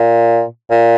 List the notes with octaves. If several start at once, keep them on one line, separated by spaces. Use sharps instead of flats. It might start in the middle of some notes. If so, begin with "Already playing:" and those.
Already playing: A#2
A#2